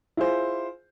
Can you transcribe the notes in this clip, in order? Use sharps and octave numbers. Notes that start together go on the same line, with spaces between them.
E4 F4 G#4 C5